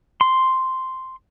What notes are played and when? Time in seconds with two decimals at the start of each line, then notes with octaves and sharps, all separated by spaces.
0.21 C6